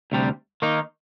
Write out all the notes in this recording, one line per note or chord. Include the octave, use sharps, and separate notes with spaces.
D2 C3 G3
D#3 A#3 D#4